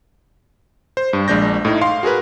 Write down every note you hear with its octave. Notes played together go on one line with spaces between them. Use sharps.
C5
G2
A#1 G#3 D4 G6 A#6
A2 D#4
F5 C6
F#4 G#4 A#4 B4